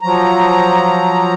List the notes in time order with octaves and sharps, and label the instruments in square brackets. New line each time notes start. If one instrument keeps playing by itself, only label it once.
[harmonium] F3 F#3 A#5